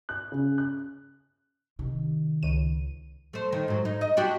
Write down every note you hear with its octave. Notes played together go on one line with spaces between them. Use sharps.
F#6
C#3
F#6
C3 D#3
C#2 D#7
A3 C5
D#3
G#2 F#3
D#4
D#5
D4 F#4 G4